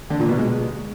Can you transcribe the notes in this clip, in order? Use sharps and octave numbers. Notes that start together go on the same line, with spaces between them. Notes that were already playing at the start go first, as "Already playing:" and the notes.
D3
A#2
B2
G#3